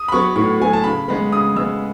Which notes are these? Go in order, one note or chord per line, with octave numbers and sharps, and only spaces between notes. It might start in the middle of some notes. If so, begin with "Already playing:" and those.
Already playing: D#6
B5
F#3 B3 C#6
A2 C#6
F#3 B3 G#5
A5
C#3 B5
G#3 B3 B5
C#3 D#6
G#3 B3 E6